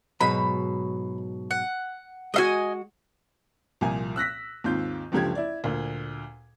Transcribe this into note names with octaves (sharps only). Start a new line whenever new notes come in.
G#2 B2 F#3 B5
F#5
G#3 F#4 D#5 E5 G#5
C2 A#2 F3 G#5
E6 F#6 A#6 B6
D#2 G#2 C4 F4 G6
F#1 C#2 D3 F3 G4 G#6
E4 D5
D2 A#2